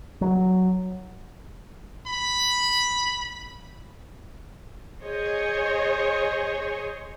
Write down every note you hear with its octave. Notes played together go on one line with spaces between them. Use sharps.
F#3
B5
G#4 C5 C#5 D#5